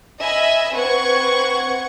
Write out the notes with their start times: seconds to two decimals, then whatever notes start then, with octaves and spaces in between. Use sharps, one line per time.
0.20 D#5 E5 G#5 B5
0.74 C4 B4 F#5 C#6 G#6